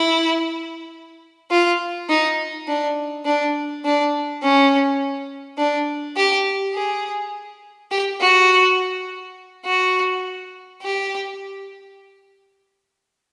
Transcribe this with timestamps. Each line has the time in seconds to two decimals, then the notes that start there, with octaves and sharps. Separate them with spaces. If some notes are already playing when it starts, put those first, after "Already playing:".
Already playing: E4
1.51 F4
2.10 D#4
2.68 D4
3.25 D4
3.85 D4
4.42 C#4
5.58 D4
6.17 G4
6.74 G#4
7.91 G4
8.20 F#4
9.66 F#4
10.82 G4